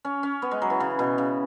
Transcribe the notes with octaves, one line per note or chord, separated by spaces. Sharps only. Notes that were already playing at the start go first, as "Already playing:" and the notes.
C#4
C#4
B3
G#3
F#3
E3
C#3
B2
C#3